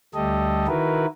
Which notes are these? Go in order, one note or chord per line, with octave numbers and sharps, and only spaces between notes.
D2 G3 A3 G4 A4 D#5
D#3 E4 F#4 A#4 B4